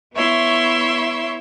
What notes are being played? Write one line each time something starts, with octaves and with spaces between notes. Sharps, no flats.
B3 E4 C#5 E5 C6